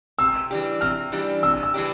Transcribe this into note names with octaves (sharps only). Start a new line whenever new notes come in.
C3 E6
E3 G3 D4 G4
C3 F6
E3 G3 D4 G4
C3 E6
E6
E3 G3 D4 G4